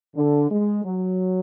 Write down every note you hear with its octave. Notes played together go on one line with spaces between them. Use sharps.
D3
G#3
F#3